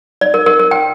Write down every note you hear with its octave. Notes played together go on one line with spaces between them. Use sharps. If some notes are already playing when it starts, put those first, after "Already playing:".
D5
A#4
A#4
A#4
G5